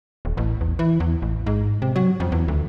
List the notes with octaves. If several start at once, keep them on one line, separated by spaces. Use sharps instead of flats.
D#1
A1
E2
E3
E2
A1
G#2
C3
F#3
F2
E2
D2